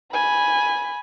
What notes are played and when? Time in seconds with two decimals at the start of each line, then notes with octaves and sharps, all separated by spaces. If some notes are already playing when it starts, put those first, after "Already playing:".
0.12 G#5 B5